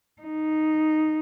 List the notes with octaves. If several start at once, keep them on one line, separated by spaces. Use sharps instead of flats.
D#4